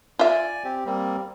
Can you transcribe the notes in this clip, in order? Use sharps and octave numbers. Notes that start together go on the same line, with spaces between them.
F4 D5 E5 G#5
C4 G4
G3 A#3 C4